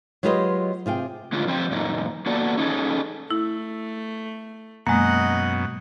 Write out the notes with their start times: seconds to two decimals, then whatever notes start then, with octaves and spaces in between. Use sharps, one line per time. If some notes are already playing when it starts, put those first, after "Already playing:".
0.23 F#3 G#3 F4 G4 B4 D#5
0.86 C3 F4 G#4 G5
1.32 A2 D3 G#3 D4 F4
1.47 F3 C4 G4 C5 G5
1.71 F#2 A#2 A#3 D#4
2.26 A#3 B3 F#4 A4 D5
2.57 C#4 D#4 G#4 A4
3.31 A3 E4
4.87 F#2 B2 G#3 A#3 D#5 F#5